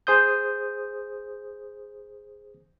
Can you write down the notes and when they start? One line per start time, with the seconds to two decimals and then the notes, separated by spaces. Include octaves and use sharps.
0.07 G#4 C5 D#6 G6